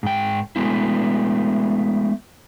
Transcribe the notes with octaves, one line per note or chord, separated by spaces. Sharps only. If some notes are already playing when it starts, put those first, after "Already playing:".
G#2 G5
G#3 A3 B3 E4